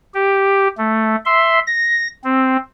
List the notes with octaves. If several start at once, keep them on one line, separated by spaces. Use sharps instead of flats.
G4
A3
E5 C6
A#6
C4